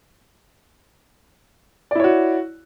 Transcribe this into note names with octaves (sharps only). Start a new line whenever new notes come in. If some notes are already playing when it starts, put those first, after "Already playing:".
E4 F#4 C#5 D5